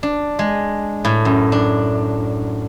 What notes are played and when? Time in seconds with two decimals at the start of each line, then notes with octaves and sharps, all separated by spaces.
0.03 D4
0.39 G#3
1.05 A2
1.25 F#2
1.52 D4